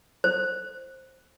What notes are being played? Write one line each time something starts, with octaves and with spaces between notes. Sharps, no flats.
C5